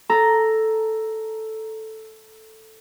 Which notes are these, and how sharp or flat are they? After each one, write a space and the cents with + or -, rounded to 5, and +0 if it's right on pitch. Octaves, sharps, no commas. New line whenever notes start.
A4 +0 A#5 +0